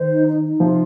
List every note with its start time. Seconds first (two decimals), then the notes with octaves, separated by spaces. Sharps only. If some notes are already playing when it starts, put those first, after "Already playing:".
Already playing: D#3 C5
0.11 D#4
0.27 D#4
0.44 D#4
0.60 C3 F3 F4